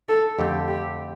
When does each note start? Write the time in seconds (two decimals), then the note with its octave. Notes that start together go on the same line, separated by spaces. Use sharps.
0.09 A4
0.39 F2 D3 A3 C4 G4
0.68 G4